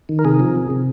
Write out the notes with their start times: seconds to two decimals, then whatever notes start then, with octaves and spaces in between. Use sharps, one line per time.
0.09 D#3
0.19 A#4
0.25 C3 G#4
0.40 F3
0.55 C3
0.70 C3